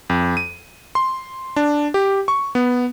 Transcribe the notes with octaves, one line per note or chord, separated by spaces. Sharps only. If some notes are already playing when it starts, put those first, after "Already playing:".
F2
D#7
C6
D4
G4
C#6
B3